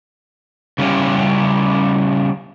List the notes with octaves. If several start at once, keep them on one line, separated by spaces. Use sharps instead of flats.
C#3 G3 C#4 E4 G4